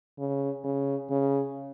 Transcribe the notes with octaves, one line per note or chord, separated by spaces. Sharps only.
C#3
C#3
C#3